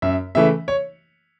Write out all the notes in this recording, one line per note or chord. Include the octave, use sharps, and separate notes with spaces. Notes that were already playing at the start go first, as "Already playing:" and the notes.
F#2 E5
C#3 E3 A3 E5
C#5